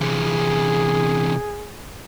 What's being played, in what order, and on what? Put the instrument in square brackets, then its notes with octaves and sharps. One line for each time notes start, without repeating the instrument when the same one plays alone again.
[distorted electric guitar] E2 C3 [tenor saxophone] G#4